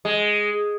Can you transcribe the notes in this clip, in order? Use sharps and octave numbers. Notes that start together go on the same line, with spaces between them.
G#3